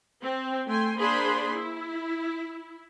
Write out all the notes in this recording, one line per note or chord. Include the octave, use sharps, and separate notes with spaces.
C4
A3 G5 G#5 C6
A#3 D4 G#4 C5 B5 C6
E4